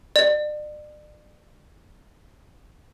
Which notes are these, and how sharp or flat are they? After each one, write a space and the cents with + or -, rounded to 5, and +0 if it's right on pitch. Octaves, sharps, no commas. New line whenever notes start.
D5 +40